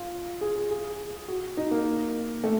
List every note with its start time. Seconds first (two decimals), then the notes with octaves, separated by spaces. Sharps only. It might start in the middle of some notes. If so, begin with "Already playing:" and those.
Already playing: F4
0.41 G#4
0.56 G#4
0.71 G#4
1.28 F#4
1.57 D#4
1.71 A#3
2.44 A3